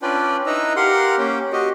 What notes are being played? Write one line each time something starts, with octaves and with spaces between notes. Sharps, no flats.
C#4 D4 F4 B4 D5 G5
D#4 E4 B4 D#5 A#5 E6
G4 A#4 F5 F#5 C6
A#3 C#4 G5
F#4 G4 D#5